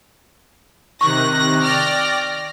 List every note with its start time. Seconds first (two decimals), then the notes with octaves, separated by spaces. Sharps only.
1.01 C3 D#3 C#6 F#6 A#6
1.63 D5 G5 D6 F6 A#6